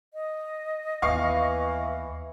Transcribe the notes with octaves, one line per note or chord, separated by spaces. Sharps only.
D#5
D#2 E3 B3 F5 C#6 C7